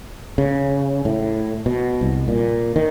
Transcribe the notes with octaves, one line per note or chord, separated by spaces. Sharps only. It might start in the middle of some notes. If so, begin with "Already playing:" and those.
C#3
A2
B2
C2
A#2
D#3